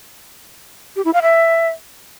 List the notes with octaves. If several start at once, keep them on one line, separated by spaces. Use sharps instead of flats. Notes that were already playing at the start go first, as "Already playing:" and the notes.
G4
E4
F5
E5